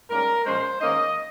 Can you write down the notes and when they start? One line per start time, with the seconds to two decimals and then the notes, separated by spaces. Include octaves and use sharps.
0.09 G#2 G3 A#3 C#4 A#4
0.45 A#2 F3 G#3 C#4 C5
0.81 G#2 D#3 A#3 C#4 D#5